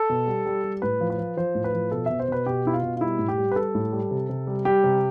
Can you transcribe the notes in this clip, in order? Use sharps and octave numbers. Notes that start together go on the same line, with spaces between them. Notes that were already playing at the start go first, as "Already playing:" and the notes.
Already playing: A4
B2
G3
G3
G3
A2 B4
F3
B4
F3
F3 C5
A2
B4
F3
B2 A4
B2 E5
C5
B2 B4
B2 G4
B2 E4
F4
B2
F4
G3 E4
A2
G4
G3
B4
G3 A4
A2
G3
C3
C3
G3
G3 G4
C3